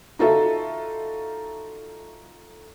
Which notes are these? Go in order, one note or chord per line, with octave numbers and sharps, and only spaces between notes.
D#4 F4 F#4 A4 E5